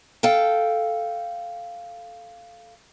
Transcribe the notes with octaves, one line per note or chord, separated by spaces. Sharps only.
A4 F5 G5